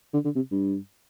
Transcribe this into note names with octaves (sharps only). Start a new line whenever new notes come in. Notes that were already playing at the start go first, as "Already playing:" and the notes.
D3
D3
C3
G2